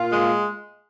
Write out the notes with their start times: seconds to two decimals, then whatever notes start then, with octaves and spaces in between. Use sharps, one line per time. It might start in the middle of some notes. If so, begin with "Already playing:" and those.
Already playing: A#2 A#3 F4
0.12 G#3